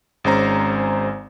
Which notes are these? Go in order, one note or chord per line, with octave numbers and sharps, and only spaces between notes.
G#1 G#3 C#4 C5 A#5